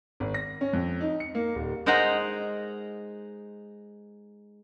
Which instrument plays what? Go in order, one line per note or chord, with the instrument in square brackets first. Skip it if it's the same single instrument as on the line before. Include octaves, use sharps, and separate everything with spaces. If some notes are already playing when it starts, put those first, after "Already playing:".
[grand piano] G#1
A#6
C#4
F2
D#4
C#7
A#3
D#1
[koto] G#3 D#4 A#4 C5 F#5 A#5